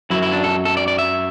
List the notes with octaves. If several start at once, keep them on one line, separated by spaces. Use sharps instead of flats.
F#2 F#3 E4
E4
D4
A4
A4
D5
D5
E5